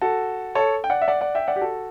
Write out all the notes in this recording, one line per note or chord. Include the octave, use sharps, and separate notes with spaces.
F#4 A4
A4 C#5
G5
D5 F#5
E5
D5 F#5
D5 F#5
E5 G5
D5 F#5
G4
F#4 A4